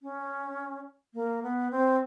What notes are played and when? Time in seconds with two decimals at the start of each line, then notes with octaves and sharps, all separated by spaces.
0.02 C#4
1.14 A#3
1.43 B3
1.71 C4